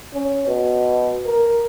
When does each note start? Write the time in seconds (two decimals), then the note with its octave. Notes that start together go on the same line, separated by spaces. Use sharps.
0.14 C#4
0.47 B2
1.27 A#4